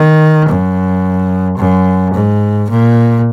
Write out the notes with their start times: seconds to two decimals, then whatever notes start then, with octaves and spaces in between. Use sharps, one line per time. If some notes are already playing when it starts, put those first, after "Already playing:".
Already playing: D#3
0.49 F#2
1.58 F#2
2.14 G#2
2.70 A#2